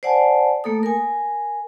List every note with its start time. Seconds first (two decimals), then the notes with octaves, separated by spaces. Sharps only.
0.03 C5 D5 F#5 G#5 A5
0.64 A3 A#3 A4 D#6
0.83 A#4 G#5